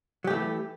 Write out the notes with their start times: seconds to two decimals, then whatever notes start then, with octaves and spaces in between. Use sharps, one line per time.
0.24 F#3
0.27 G4
0.30 A3
0.33 E3